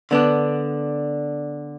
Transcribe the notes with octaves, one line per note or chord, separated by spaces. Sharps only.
D3 B3 D4